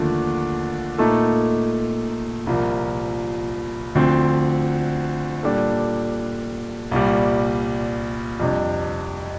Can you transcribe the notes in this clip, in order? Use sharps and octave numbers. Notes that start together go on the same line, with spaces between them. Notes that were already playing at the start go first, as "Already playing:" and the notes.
Already playing: D#2 D3 F3 A3
A#2 A3 D#4 A4
C2 A#2 F3 A#3
D2 D3 F3 C4
A#2 G3 D4 A4
C2 A#2 G3
F2 C3 G3 D4